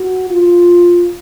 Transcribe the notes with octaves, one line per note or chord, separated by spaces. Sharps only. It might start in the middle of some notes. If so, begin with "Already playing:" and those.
Already playing: F#4
F4